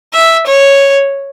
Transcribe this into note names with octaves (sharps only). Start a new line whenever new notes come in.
E5
C#5